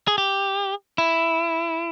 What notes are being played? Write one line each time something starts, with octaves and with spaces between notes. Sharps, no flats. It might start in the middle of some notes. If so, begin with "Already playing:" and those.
G#4
G4
E4